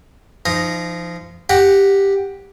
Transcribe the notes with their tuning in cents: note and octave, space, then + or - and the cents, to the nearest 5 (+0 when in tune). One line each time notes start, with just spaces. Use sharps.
F3 -25 D#4 +0 A#5 -5
G4 +5 F#5 +0 A#5 +0